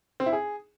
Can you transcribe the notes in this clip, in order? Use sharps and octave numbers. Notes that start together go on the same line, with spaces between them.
C4
E4
G#4